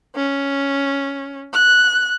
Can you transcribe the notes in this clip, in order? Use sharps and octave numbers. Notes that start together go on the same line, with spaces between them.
C#4
F#6